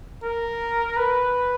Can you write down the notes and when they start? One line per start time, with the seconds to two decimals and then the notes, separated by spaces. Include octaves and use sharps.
0.23 A#4
0.97 B4